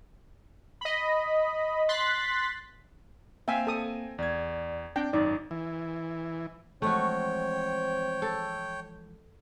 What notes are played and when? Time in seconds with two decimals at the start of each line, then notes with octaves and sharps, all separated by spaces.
0.81 D#5 B5
1.89 C6 F#6 A6 B6
3.48 A#3 C4 E5 F5 G5 G#5
3.67 A4 D#6
4.18 E2 D5 G#6
4.96 C4 D4 G5
5.13 G#1 F#2 D#4 D5
5.51 E3
6.82 E3 F3 G#3 A3 C4 F#4 C#5 G5
8.22 A4